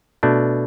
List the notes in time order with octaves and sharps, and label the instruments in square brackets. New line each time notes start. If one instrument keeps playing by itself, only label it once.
[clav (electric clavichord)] B2 A3 D4